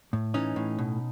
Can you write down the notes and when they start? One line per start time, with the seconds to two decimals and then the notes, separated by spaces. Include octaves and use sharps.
0.13 A2
0.34 E3 C#4 D#4
0.56 A2
0.79 B2